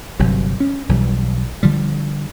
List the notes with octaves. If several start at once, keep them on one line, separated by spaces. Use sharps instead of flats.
G1 C3 F#3
C#4
B1 E3 G3
D3 F3 G3